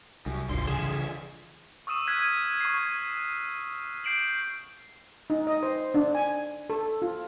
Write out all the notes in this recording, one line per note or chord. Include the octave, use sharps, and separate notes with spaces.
C2 F#2
G#1 D2 G#2 D3 F3 C6
C#3 E3 G#4 G#5
C#6 D#6 E6 D#7 E7
F6 F#6 G#6 B6 D#7
C#6 C7
G#6
D6 G6 C7 D7 E7 F#7
D#4
D#5
C5
D4
G#5
A4
F4